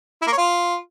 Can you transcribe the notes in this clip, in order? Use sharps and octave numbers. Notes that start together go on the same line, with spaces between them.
E4
A#3
C#5
F4